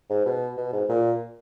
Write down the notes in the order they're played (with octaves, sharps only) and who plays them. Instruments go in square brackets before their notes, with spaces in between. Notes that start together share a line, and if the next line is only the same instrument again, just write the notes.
[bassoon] G#2
B2
B2
G#2
A#2